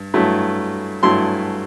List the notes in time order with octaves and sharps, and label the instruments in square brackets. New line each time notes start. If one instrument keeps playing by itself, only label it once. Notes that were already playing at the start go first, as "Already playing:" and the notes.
Already playing: [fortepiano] G2
G2 F#3 A3 E4
G2 F#3 A3 E4 C6